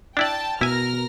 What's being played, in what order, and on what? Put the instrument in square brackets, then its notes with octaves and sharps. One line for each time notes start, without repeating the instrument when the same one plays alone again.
[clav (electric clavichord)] D4 E4 D5 [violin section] G5 A5
[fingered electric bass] B2 [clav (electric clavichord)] E4 G#5 [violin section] A#4 F6 A#6